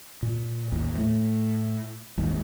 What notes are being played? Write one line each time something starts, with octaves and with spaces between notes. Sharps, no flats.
A#2
A1 D#2
A2 A3
G#1 D#2 G#3